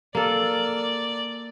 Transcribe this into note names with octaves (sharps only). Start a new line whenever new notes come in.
A#3 A4 D5